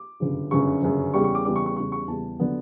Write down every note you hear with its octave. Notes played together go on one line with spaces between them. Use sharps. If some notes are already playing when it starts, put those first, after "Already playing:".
Already playing: D6
G1 F#2 C#3
G1 F#2 C#3 C#6
G1 F#2 C#3
E2 C#3 G3 C#6
C#6
D6
E2 C#3 G3 D6
C#6
C#6
E2 C#3 G3 C#6
C#6
E2 C#3 G3 A5
D3 F#3 B3